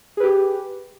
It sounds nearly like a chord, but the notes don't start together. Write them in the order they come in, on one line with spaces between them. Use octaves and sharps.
G#4 B4 G4